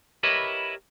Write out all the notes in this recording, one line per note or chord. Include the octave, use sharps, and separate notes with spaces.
E4 G4 A#4 B4 C#5 D#5